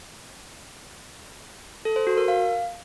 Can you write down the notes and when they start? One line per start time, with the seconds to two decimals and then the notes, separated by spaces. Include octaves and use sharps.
1.85 A4
1.96 C5
2.07 F#4
2.17 A#4
2.28 F5